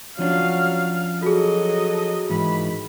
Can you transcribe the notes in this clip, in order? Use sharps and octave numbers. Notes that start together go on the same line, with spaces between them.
F3 F#3 C#4 D4 F5
F#3 F#4 G#4 A4 D#5
G#2 D#3 E3 B5